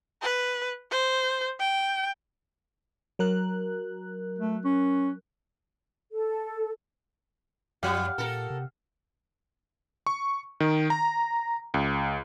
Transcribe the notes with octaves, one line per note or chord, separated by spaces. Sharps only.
B4
C5
G5
F#3 A#4 F#6
A3
C#4
A4
F#2 F3 G3 G4 F5 F#5
A#2 A4 A#4
C3
C#6
D#3
A#5
C#2